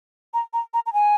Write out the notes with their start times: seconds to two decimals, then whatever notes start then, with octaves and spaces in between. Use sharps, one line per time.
0.34 A#5
0.53 A#5
0.74 A#5
0.86 A#5
0.93 G#5